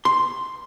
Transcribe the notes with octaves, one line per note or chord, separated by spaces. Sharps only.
C6